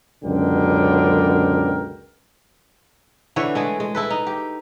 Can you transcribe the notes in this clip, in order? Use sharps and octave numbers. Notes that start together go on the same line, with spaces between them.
C#2 F#2 B2 D3 A#4 G5
D3 E3 B4 C#5
G#3 A3 G#4
G#3
E4 A4 B4
D#4
G4